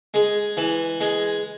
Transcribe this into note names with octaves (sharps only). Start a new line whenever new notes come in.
G#3
E3
G#3